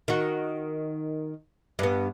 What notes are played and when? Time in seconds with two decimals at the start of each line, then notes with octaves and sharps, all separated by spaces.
0.08 D#3 F#4
1.79 G2 B3